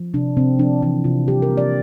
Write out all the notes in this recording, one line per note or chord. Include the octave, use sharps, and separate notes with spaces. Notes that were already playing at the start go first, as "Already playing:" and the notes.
Already playing: F3
C3 D4
C3 C4
F3 D4
E3 D4
C3 F4
G3 G4
A#4
A#3
D5